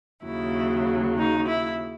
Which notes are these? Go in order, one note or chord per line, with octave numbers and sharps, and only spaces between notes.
D#2 C#3 F#3 E4
D#4
E4